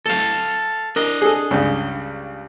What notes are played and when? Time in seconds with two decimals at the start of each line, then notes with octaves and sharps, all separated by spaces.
0.06 A3 A4 F5
0.96 D4 A#4 D#5
1.22 G#4 A4
1.51 C#2 G2 C#3